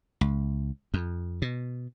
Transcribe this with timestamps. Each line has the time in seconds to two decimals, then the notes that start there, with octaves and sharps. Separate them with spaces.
0.21 C#2
0.94 F2
1.42 B2